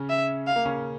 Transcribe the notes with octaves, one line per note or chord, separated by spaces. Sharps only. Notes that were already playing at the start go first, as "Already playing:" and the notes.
Already playing: C#3 C#4
E5
F5
A#3
C#3 C#4